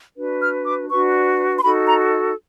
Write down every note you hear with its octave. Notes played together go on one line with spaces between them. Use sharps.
D4 F#4 B4
F6
D6
D4 F#4 B4 C#6
C6
D#4 F#4 A4 B5
A#5